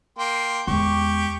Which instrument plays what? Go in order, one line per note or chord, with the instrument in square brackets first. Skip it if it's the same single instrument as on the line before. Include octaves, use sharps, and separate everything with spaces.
[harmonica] A#3 G5 C6
[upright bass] E2 G#3 [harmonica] G4 C#6